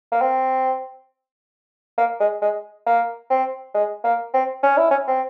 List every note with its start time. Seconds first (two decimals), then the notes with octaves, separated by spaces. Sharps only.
0.12 A#3
0.21 C4
1.98 A#3
2.20 G#3
2.42 G#3
2.86 A#3
3.30 C4
3.74 G#3
4.04 A#3
4.34 C4
4.63 C#4
4.77 E4
4.91 C#4
5.08 C4